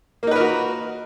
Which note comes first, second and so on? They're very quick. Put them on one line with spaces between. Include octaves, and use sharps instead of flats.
A#3 D#4 B4 A#4 F#4